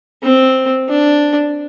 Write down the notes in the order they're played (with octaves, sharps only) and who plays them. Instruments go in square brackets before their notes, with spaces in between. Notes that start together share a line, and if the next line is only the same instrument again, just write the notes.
[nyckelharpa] C4
D4